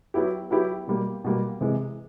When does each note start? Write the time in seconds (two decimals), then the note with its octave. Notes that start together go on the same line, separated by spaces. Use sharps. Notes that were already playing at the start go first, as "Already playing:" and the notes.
0.14 F#3 B3 E4 G4
0.51 F#3 B3 E4 G4
0.87 B2 G3 A#3
1.24 B2 G3 A#3
1.61 C3 E3 G#3